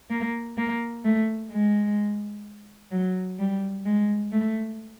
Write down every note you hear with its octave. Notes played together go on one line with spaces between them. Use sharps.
A#3
A#3
A3
G#3
F#3
G3
G#3
A3